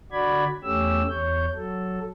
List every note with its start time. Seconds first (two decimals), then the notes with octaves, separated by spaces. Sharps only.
0.12 D3 F#4 D5 B5 G#6
0.64 E2 A3 C#4 G4 E6
1.09 E2 C#5 G6
1.54 F#3 A4